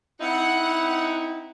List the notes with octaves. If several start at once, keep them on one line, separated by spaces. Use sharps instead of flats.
C4 D#4 E4 F#5